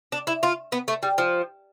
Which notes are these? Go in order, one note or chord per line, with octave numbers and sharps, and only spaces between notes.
D4
E4
F4
B3
A3
G3
F3